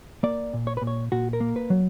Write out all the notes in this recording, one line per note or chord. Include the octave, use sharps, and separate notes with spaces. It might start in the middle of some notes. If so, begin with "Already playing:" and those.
A#3 D5
A#2
C#5
A#2 B4
C#5
A#2 F#4
A#4
A#3
B4
F#3